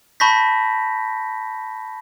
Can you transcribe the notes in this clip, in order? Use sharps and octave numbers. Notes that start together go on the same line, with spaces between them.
A5 B5 C#6 G6 A#6 B6